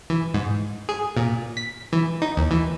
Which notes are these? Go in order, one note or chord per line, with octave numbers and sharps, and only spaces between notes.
E3
G#2
G#4
A#2
B6
E3
D#4
D#2
E3